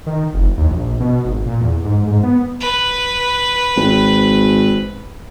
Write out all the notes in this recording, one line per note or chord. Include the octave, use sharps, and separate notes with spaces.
D#3
F#1
D#2
A#1
B2
G#1
A#2
E2
G#2
G#2
B3
B4
G#1